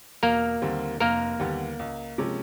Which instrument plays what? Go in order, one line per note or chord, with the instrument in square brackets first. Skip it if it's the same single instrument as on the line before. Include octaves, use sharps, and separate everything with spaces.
[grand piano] E1 [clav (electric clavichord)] A#3 A#4
[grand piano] D#2 D3 G3 C4
[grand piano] F1 [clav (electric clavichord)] A#3 A#4
[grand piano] D#2 D3 G3 B3
C#2
C3 F3 G#3 C#4